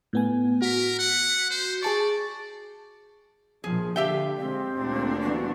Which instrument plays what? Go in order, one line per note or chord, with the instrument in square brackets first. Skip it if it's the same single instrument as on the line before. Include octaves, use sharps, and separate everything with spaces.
[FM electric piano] A2 B3 G#5
[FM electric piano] F#4 B6 [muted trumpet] A#4
[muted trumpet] F#5
C5
[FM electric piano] G#4 A5 C#6 [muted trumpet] D5
[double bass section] A#1 F3 [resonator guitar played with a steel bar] G#4
[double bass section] D3 [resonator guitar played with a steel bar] G4 E5 G5 [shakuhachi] F5
[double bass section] G#3 [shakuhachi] C4
[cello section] D2 A#2 D4
[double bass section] E3 G3 B3 [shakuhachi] F#4